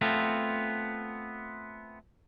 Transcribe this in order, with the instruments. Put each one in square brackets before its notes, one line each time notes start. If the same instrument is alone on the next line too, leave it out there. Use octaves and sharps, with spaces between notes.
[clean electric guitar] A3 B3 C4 F4